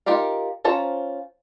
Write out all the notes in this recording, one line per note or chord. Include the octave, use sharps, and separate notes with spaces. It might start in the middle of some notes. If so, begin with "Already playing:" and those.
D#4 F4 G4 A#4 F5
C#4 F4 C5 A5 A#5